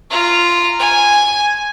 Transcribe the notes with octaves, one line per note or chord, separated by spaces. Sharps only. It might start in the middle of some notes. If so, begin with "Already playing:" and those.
F4 A#5
G#5